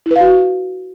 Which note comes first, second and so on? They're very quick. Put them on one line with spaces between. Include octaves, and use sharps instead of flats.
E4 B4 F5 F#4